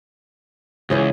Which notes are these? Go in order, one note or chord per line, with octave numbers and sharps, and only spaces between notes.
C#2 E3 C#4 G#4